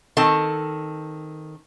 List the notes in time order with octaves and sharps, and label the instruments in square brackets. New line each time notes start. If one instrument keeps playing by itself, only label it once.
[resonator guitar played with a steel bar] D#3 C4 A4 A5